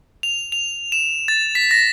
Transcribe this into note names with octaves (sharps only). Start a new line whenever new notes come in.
F7
F7
E7
A6
B6
A#6